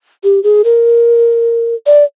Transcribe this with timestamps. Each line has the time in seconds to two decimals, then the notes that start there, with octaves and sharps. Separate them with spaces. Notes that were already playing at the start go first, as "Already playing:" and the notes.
0.24 G4
0.44 G#4
0.64 A#4
1.86 D5